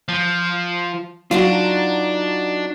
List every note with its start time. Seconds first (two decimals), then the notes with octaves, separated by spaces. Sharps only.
0.08 F3
1.31 F#3 D4 D#4 F4 F#4